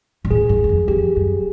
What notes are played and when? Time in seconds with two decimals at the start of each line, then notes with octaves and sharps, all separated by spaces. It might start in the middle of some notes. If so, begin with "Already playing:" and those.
0.25 A#2
0.31 A2 G#4
0.49 G#2
0.64 E2
0.69 F2
0.88 F2 G4
1.16 F#2